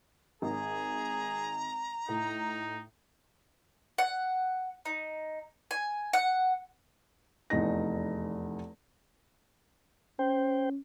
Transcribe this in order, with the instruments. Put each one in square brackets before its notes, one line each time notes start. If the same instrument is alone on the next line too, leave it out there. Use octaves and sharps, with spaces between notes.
[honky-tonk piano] G#1 [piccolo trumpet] G#4 [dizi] A#5
[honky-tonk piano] A2 [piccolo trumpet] D#4
[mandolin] F#5
D#4
G#5
F#5
[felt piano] F1 E2 D#4 A#6
[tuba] C#4 [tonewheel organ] C5 G5